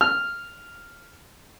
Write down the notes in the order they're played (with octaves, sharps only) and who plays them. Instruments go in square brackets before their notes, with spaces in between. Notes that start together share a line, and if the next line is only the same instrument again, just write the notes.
[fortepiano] F6